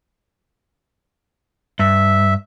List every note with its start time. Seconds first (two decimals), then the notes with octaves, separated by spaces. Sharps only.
1.79 G2 E5